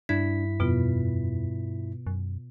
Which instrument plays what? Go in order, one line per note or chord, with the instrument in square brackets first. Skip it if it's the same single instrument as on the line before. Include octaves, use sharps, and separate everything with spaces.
[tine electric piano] G2 E4 B6 [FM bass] D4 [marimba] G#6
[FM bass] F2 [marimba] B2 B3 F4
[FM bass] F#2